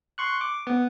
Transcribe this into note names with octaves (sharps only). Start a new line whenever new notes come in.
C6 C#6 F#6
D6
B3